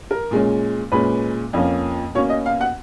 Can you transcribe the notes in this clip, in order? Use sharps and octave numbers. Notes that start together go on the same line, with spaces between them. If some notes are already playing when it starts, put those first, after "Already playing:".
A#4
A#2 G#3 C#4
A#2 G#3 C#4 B4
F2 F3 A#3 C#4
B2 A#3 C#4 C#5
D#5
F5
F#5